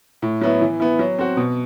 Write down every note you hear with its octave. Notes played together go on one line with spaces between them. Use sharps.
A2
F#3 B3 E4
E3
B3 E4
F#3
C4 F#4
B2